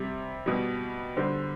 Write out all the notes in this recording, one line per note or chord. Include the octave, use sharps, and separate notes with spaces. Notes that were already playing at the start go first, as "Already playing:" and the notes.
Already playing: C3 G3
B2 G3
D3 G3 C5